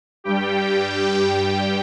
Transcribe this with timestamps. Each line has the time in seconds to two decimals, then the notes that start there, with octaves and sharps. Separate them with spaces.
0.24 G2 G3 G4 G5